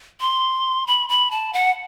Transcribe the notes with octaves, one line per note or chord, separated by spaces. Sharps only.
C6
B5
B5
A5
F#5